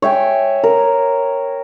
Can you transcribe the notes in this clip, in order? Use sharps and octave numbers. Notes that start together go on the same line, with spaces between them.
C#5 E5 G5 G#5
A#4